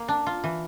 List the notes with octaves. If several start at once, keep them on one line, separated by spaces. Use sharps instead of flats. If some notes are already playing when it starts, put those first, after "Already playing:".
Already playing: A#3
D4
F4
E3